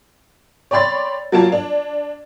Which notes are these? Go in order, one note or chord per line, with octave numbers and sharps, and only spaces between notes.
C#5 D5 G5 B5 C6 A6
F#3 A#3 F4 A5 G#6
D4